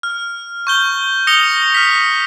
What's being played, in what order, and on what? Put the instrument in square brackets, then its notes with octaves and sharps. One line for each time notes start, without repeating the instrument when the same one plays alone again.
[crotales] F6
C#6 G6 G7
D#6 A#6 C#7 F7 G7
F6 B6